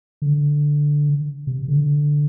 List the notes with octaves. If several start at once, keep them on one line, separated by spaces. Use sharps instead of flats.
D3
C3
D3